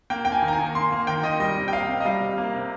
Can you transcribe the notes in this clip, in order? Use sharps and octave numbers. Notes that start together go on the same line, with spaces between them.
A#3 G5
A#3 G5
G#5
D#3
A#5
G#5
D#3
A#3 C6
A#3
D#3 G5
D#3 D#5
G3 D#5
C3
G5
A#3 F5
C3
D#5
G3 F5
C3
A#3
C3